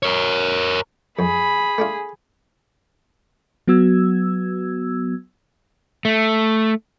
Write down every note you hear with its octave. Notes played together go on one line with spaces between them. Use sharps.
A#4 C#5
F2 G#4 B5
A3 D4 F4
F#3 B3 F#4 E6 G#6
A3